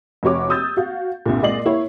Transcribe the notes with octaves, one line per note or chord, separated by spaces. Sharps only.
F1 C3 F#4 C#5 D6
D#6 E6 G6 A6
F#4 F5
C2 G2 A#2
A#2 G#3 D5 D#5 C7 F#7
A#3 E4 C#5